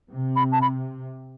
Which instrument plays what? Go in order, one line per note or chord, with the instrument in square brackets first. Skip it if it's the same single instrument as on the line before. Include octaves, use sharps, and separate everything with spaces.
[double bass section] C3
[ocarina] B5
A5
B5